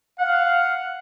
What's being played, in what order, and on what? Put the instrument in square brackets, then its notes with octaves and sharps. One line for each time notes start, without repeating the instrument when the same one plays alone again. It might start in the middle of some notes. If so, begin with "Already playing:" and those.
[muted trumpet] F5 [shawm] F#5